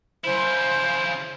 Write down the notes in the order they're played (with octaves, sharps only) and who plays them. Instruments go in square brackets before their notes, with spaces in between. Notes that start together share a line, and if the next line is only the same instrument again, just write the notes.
[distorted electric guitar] C#3 E4 [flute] C5